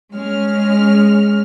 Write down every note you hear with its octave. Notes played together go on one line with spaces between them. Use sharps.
G#3 C#4 F6